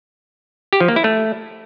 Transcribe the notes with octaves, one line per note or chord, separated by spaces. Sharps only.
G4
F3
A#3
E4
A3